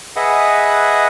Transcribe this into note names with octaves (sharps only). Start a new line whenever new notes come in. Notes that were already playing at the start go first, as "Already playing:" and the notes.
G#4 B4 D#5 E5 F#5